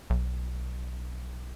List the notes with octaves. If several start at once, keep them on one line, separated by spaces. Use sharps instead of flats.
B1